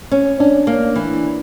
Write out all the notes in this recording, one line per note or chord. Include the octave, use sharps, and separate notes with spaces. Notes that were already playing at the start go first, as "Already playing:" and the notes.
C#4
C#4 D4
A#3
E3